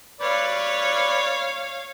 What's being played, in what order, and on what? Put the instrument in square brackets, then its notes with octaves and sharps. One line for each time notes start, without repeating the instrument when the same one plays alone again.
[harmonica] B4 D5 [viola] C#5 F5